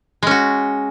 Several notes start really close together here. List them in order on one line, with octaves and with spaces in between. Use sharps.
G#3 C#4 F#4